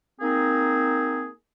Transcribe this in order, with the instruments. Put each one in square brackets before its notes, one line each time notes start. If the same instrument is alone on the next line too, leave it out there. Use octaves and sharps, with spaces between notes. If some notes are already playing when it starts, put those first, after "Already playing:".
[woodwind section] A#3 C4 D#4 G#4